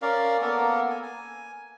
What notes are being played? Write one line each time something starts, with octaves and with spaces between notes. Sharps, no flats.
C#4 A#4 D5 F5
A#3 B3 A4 A#4
G#5
G#5